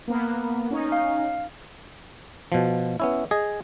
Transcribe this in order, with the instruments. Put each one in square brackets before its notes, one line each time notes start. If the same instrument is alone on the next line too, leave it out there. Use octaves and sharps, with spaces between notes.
[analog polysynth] A#3 B3
C#4 D#4
[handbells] F5
[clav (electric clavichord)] B2 F3
B3 C#4 E4
G#4 D#5